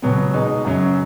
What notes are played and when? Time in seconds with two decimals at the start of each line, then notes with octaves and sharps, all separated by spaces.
0.02 C#2 B2 F#3 B3
0.33 B2 G#3 D#4
0.65 F#2 C#3 F#3 C#4